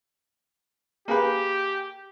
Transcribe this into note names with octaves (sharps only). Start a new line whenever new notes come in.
A#3 G4 G#4 B4